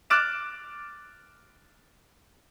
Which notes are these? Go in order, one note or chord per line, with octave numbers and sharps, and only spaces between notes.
D6 F6 F#6 A6 D7 E7